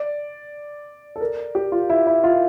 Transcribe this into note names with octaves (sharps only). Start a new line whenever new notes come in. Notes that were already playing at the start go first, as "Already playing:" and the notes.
Already playing: D5
A4
A#4
G4
F4
E4
E4
F4